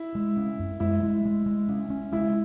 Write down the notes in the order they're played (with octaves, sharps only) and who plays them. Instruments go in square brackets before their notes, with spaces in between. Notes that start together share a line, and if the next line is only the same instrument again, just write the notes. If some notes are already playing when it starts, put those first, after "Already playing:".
Already playing: [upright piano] E4
[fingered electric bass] G#3
C#4
F#2
[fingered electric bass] G#3 [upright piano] E4
[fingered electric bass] G#3
G#3
G#3
C#4
C#4
[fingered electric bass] G#3 [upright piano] E4